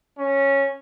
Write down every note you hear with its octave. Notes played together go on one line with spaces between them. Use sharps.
C#4